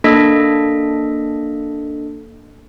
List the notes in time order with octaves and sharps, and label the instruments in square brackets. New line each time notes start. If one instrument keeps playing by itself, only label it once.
[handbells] A#3 D4 A4 D#5 B6